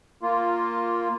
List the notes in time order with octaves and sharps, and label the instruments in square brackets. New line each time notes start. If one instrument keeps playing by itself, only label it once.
[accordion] A#3 F4